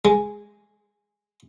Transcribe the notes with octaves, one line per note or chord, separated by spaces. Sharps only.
G#3